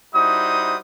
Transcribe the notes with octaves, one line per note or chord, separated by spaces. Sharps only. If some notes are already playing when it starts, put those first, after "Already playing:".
G3 D#4 E4 F#4 C5 D#6